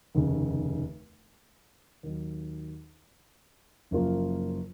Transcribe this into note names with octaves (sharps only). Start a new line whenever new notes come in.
F1 D#2 C#3
D#2 D#3 F#3
F#1 F#2 F3 A#3 F4